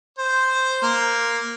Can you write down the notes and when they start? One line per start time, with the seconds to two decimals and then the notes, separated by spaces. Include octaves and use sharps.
0.19 C5
0.82 A#3